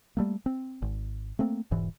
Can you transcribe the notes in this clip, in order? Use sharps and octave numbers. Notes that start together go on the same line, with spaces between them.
G3 A3 A#3
C4
G#1
A3 A#3 C4
E1 G#2 E3